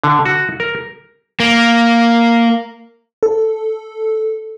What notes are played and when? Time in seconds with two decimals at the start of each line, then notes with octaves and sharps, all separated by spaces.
0.04 D3
0.25 F#4
0.60 A#4
1.40 A#3
3.23 A4